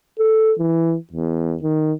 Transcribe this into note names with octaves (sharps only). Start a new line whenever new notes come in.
A4
E3
E2
D#3